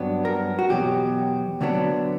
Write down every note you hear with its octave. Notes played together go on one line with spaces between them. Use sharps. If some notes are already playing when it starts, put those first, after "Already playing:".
Already playing: G2 F#3 B3 D4
A#4
F#4
E2 B2 F#3 G4
D2 D3 F#3 B3 D4